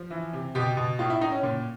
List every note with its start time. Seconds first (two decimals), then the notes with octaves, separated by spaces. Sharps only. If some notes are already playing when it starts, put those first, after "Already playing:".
Already playing: F3
0.11 E3
0.33 C3
0.55 B2 G4
0.77 B2
0.99 A2 F4
1.10 E4
1.21 A2 D#4
1.32 C#4
1.43 A#2